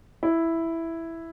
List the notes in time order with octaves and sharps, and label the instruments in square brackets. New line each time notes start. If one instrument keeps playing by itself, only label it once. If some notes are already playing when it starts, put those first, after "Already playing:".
[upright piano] E4